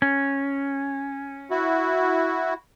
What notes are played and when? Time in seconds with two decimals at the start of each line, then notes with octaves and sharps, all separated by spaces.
0.02 C#4
1.51 E4 F#4